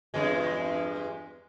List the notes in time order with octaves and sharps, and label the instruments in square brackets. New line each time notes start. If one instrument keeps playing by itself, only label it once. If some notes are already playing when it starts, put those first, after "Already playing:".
[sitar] E2 G2 G#3